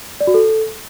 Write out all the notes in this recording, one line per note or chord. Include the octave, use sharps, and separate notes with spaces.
D5
F#4
A4